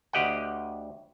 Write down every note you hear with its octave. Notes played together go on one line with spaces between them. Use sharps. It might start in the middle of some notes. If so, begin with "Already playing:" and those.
D2 G4 D#5 F#5 G5